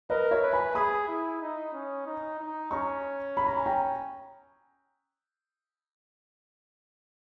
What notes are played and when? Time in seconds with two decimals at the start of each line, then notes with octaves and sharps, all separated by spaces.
0.10 A#4 B4 D#5
0.31 C#5 E5
0.42 B4
0.53 G#5 B5
0.75 G#4 B5 D#6
1.08 E4
1.41 D#4
1.73 C#4
2.06 D#4
2.39 D#4
2.71 C#4 A#5 C#6
3.37 B5
3.46 A#5
3.56 G#5
3.66 G5 A#5